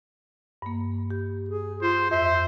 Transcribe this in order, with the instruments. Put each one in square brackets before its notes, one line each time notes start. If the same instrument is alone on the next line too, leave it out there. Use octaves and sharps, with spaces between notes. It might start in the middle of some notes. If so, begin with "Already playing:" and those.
[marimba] G2 A#3
G4
[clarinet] G#4
[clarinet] F4 [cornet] C5
[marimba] F2 [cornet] C5 [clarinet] E5